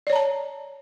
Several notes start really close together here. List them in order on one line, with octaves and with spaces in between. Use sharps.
D5 C#5 A#5 A5